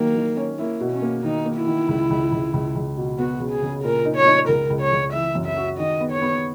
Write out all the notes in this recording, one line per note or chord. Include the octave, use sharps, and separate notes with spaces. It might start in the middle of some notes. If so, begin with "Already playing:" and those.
Already playing: D#3 F#3 A#3
D#3
C#4
A#3 E4
B2
C#4
A#3
D#3 D#4
A#3
E4
D#3
C#2
C#2
C#2
C#2
C#2
B2
B3 F#4
C#3
G#4
C#3
A#2 A#4
D#4
C#5
D#4
C#2 A#4
C#2
C#5
C#2
E3 E5
F#2
E5
F#4
D#3 D#5
B3
C#5
B3